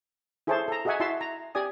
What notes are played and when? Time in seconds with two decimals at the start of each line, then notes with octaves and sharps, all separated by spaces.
0.47 E4 G#4 A4 C5 C#5 A5
0.68 A4 A#5
0.85 F#4 G#4 D#5 E5 F#5 G#5
1.00 E4 F#4 E5 A5 C6
1.21 A#5
1.55 G4 D5 G#5 D#6